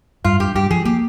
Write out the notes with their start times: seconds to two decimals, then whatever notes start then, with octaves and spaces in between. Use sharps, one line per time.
0.24 G2 F4
0.40 G2 G4
0.55 G2 G4
0.71 F3 G#4
0.85 A#3 G4